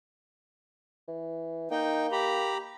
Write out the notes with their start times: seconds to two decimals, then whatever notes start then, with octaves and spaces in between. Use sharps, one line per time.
1.08 E3
1.71 A#3 D#4 G5
2.12 G4 A#5 B5